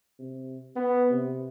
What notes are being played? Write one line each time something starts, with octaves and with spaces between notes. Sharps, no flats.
C3
B3
C3